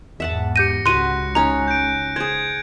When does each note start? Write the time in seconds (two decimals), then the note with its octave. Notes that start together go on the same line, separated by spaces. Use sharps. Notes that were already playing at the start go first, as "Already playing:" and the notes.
0.20 E2 G#2 E5 F#5 A5
0.56 G4 G6 A#6 C#7 D#7
0.86 C#2 F#4 B4 A#5 C6 F#6 D#7
1.35 C#4 D#4 A#5
1.68 G6 D7
2.16 G#4 C5 G#6